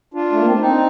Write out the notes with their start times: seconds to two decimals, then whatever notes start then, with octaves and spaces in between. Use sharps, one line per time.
0.14 D4 F4
0.32 A3
0.39 A#3
0.46 C4
0.53 D4
0.60 C4 D#4